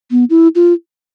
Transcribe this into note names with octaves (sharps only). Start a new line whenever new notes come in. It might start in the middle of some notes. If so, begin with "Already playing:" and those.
B3
E4
F4